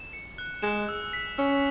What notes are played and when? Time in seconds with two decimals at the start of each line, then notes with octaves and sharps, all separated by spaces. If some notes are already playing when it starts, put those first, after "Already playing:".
Already playing: E7
0.13 C#7
0.38 F#6
0.62 G#3 E7
0.89 E6
1.13 B6
1.38 C#4 E6